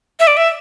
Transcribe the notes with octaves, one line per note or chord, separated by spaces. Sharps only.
E5
D5
E5